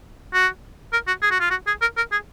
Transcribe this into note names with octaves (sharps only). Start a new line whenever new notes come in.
F#4
A#4
F#4
G#4
F#4
F4
F#4
G#4
A#4
A#4
G#4